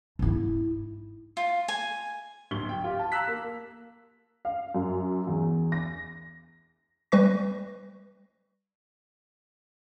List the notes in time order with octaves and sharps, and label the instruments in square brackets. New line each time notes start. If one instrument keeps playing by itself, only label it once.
[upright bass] G#2 E4
[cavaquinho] F4
G#5
[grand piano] D1 G7
G5
F4 G4
A5
F5 A#5 E6 F#6 B6
A#3
[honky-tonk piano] F5
F#2
E2
A#6
[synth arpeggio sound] G3 B4 C#6 A#6